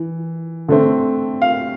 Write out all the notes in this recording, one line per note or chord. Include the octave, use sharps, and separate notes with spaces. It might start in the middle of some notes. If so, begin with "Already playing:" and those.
Already playing: E3
D3 A3 C4
F5